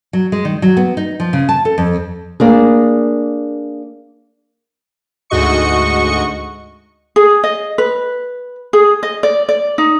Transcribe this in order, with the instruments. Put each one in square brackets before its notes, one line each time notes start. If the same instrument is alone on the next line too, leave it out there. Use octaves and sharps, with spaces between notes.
[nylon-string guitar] F#3
G#3
D#3
F#3
B3
D#4
F3
C#3
A5
A4
F2
A#3 D4 G#4
[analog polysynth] D2 G#2 F#4 D#5 C#6 C#7
[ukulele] G#4
D#5
B4
G#4
D#5
D5
D5
D#4